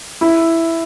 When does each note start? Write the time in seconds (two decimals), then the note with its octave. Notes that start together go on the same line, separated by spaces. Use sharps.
0.21 E4